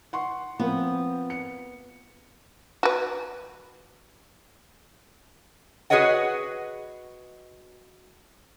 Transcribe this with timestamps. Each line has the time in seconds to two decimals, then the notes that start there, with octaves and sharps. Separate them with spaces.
0.13 F#5 C6 C#6
0.59 F3 B3 C4 A#4
1.30 C#7
2.83 F#4 B4
5.90 F#4 G#4 B4 C#5 D#5 F#5